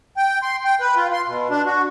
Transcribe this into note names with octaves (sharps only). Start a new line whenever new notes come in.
G5
C6
G5
B4
F4
C6
B2
D4
F#4